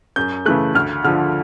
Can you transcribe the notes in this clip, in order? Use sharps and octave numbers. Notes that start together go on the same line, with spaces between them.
F#2 G6
C#3 E3 A3 F#6
D2 F6
D3 F3 F6